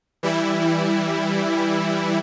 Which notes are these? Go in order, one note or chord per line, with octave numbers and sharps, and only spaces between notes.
E3 G3 E4